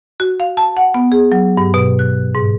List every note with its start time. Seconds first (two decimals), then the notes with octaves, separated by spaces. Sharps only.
0.20 F#4
0.40 F5
0.57 A5
0.77 F#5
0.94 B3
1.12 G#4
1.32 F#3
1.57 G2
1.74 B2
1.99 F#6
2.35 G#2